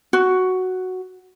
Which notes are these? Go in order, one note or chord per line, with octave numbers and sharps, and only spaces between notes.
F#4